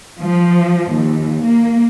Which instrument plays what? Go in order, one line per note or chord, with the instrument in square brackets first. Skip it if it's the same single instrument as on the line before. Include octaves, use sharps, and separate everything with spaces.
[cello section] F3
D#2
A#3